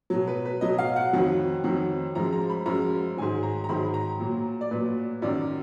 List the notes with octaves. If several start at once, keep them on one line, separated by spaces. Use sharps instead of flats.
B2 F#3
B4
B4
B2 F#3 D#5
F5
F#5
F2 D#3 F#3
F2 D#3 F#3
F#2 F3 G#3 A#5
A#5
B5
F#2 F3 G#3 A#5
G#2 D#3 F#3 G#5
A#5
A#5
G#2 D#3 F#3 B5
A#5
A#2 F#3
D5
A#2 F#3 B4
F#2 D#3 F#3 D5